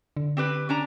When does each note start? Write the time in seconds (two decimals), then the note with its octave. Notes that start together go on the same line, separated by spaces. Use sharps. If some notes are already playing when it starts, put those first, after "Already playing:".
0.17 D3
0.37 C4 G4 B4
0.69 C#4 D4 A#5